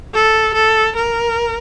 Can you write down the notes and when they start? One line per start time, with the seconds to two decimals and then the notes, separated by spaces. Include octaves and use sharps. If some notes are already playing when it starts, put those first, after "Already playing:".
0.14 A4
0.55 A4
0.96 A#4